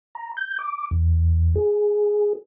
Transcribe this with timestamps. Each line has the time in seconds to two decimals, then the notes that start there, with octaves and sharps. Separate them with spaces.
0.15 A#5
0.37 G6
0.59 D6
0.91 E2
1.55 G#4